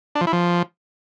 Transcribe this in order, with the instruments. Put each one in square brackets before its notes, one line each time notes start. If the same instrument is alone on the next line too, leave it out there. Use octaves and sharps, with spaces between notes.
[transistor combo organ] D4
F3
E4
F3